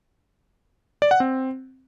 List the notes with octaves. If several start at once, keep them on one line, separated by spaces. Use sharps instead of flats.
D5
F#5
C4